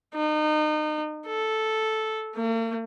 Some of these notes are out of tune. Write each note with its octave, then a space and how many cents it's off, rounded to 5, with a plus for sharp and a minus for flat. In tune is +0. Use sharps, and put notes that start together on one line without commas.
D#4 -30
A4 -5
A#3 -45